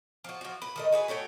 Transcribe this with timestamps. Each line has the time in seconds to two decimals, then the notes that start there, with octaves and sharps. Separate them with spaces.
0.24 F3 F#4
0.41 F3 F#4
0.62 B4
0.76 D#3 A3 D#5
0.92 F#4 G#4 B4
1.08 A3 F#4 C#5 G5